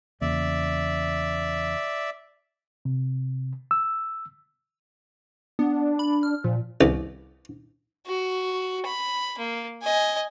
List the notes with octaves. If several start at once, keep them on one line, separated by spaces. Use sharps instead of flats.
E2 C#3 A#3 D5 E5
C3
E6
B3 D4
B5
F6
A#2 F3
C2
F#4
B5
A#3
D#5 G#5